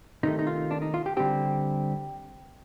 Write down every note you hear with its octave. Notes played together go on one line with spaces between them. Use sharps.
C3 D#3 A3 D#4
D#4
F4
D4
D#4
F4
G4
D3 G3 C4 G4